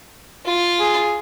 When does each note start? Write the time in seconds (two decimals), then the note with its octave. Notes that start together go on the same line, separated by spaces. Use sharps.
0.46 F4
0.80 G#4